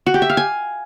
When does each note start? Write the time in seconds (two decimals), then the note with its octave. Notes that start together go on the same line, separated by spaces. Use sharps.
0.06 F#4
0.14 G4
0.22 E5
0.30 F5
0.37 G#5